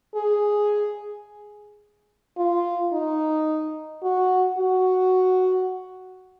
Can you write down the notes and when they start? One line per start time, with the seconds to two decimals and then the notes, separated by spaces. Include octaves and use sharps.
0.15 G#4
2.37 F4
2.93 D#4
4.03 F#4
4.58 F#4